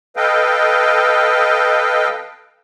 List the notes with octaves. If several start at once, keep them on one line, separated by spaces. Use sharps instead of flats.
A4 B4 D#5 F5 G5